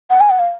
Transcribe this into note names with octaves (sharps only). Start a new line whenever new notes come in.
F#5
G#5
F#5
F5